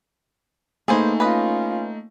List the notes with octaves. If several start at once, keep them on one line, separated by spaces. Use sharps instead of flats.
A3 A#3 D#4 G#4 B4 C5 F5 G#5
C#4 F4 B4 D#5